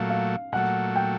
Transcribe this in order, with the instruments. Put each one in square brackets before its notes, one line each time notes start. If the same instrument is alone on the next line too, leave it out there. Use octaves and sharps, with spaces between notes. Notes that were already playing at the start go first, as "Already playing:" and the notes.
Already playing: [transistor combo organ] A#2 F#3 A3 [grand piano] F5
[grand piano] F5
[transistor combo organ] A#2 F#3 A3 [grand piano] F#5
[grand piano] G5